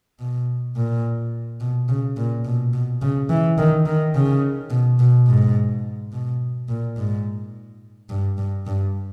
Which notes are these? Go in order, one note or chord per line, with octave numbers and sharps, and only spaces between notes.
B2
A#2
B2
C#3
A#2
B2
B2
C#3
E3
D#3
D#3
C#3
B2
B2
G#2
B2
A#2
G#2
G2
G2
G2